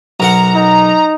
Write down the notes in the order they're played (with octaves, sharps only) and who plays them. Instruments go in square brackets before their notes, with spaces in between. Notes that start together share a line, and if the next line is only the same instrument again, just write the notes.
[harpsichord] B1 A#4 F#5 [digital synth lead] A#5
[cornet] D#4